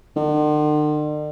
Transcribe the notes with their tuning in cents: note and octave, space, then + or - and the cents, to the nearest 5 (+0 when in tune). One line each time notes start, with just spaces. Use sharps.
D3 +45